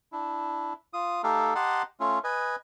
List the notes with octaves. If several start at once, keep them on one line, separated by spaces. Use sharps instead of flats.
D4 E4
F4 D#6
A3 D#4 G4 A4 F5
G4 D#5 F#5 A5 A#5 C6
A3 C#4 F4
B4 D#5 G#5